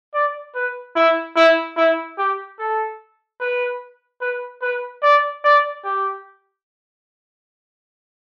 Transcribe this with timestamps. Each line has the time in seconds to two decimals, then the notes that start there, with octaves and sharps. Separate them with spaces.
0.14 D5
0.55 B4
0.96 E4
1.36 E4
1.77 E4
2.18 G4
2.59 A4
3.40 B4
4.22 B4
4.62 B4
5.03 D5
5.44 D5
5.84 G4